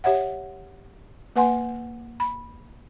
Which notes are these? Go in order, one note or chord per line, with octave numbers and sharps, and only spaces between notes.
G4 C#5 E5 F#5
A#3 B4 F#5 G#5 C6
B5